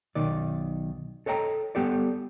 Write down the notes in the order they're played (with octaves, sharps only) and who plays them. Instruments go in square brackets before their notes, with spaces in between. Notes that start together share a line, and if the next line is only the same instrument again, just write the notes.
[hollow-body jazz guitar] B1 D#3 D5
A4 C#5 D#5 G5 A#5
G3 B3 G4 A4 D5